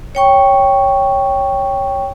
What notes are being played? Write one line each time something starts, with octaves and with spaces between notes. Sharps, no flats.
C#5 G5 C#6